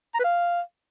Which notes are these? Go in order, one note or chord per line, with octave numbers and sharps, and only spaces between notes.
A#5
B4
F5